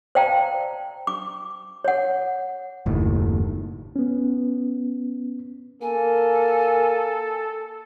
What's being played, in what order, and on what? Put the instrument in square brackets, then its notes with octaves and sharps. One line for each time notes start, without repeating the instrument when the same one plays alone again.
[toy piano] C5 D5 F5 G5 A5 A#5
D6
C#5 F#5
[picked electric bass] F#1 D#2 A2
[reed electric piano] B3 C#4
[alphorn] A#3 [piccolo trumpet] A4 [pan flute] G#5